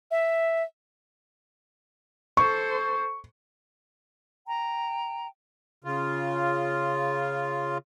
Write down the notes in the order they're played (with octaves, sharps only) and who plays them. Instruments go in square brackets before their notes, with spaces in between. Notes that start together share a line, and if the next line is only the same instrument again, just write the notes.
[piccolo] E5
[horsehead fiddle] A4 C5 [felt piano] C#6
[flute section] G5 A#5
[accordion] C#3 F4